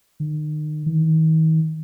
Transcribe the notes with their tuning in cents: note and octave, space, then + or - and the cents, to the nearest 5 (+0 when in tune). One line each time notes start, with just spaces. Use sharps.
D#3 -35
D#3 +40